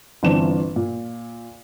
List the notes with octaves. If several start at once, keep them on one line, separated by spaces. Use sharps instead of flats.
G1 E3 C4 D4 E7
A#2